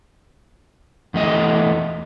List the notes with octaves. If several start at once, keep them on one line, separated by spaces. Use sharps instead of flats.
E2 A3 D#5